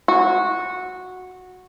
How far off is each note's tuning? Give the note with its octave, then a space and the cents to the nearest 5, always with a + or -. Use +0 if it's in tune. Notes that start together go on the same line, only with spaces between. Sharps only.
F#4 -10